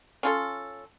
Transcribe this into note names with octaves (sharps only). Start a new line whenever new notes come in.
C#4 F4 A4